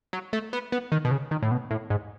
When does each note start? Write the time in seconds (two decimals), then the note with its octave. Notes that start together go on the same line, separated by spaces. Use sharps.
0.13 F#3
0.33 A3
0.53 B3
0.72 B3
0.92 D#3
1.05 B2
1.11 C#3
1.31 D#3
1.43 A2
1.51 B2
1.71 A2
1.90 G#2